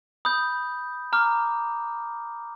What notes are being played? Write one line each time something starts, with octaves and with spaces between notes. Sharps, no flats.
B5 D#6 G6
A#5 D6 F6